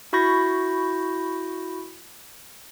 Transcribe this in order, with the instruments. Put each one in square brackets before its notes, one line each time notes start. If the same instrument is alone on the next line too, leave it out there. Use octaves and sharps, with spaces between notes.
[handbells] E4 F#4 B5 C#6 G6 A#6